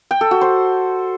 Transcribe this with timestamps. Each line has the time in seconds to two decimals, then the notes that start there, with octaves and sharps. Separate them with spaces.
0.11 G5
0.21 A4
0.31 F#4
0.41 C5